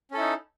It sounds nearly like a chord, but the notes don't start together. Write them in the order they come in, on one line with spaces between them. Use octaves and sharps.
C#4 A4 E4 D#4